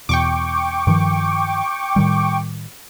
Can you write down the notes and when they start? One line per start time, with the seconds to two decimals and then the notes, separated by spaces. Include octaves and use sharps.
0.09 E2 B2 G5 C#6 D6
0.87 G2 D#3 F3
1.96 A2 D#3 G3